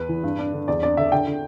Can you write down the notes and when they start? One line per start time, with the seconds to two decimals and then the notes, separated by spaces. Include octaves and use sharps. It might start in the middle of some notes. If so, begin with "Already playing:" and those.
Already playing: E2 B4
0.09 E3
0.23 G2
0.39 D4
0.53 D3
0.68 E2 D5
0.82 D4 D5
0.97 D3 E5
1.12 D3 G5
1.27 D3